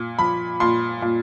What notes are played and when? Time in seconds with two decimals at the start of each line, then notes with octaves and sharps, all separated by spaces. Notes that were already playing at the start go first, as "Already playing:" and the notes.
Already playing: A#2
0.19 F3 B5
0.60 A#2 C6
1.02 A#2